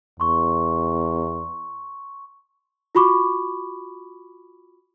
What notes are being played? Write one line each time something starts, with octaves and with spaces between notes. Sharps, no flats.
E2 C6 C#6
F4 F#4 B5 C#6 D6